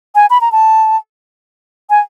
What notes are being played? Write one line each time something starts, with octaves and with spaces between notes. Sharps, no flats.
G#5
B5
A#5
A5
G#5